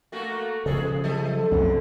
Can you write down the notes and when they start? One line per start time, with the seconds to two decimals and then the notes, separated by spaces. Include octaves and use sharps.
0.12 A3 A#3 F#4
0.66 A#2 C#3 F3 G#4 A4
1.04 F#3 A4 E5
1.51 C2 F#2 D3 F3